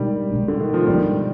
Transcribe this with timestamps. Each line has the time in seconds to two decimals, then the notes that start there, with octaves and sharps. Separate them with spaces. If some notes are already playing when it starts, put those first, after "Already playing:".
Already playing: B2 D#3 G3 G#3 D4
0.31 B2 G#3 D4
0.48 D3
0.61 D#3
0.74 F3
0.87 B2 D#3 G3 G#3 D4